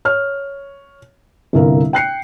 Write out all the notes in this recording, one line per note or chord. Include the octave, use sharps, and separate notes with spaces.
C#5 F6
G1 C2 A#4 F5
G5 F#6 C7 C#7